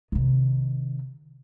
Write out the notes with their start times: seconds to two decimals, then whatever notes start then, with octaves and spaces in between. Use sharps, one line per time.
0.12 C3 D#3